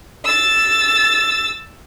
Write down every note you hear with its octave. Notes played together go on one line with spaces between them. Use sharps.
E6 A6